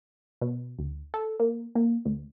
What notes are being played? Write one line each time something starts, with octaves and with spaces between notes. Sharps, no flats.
B2
D2
A4
A#3
A#3
D2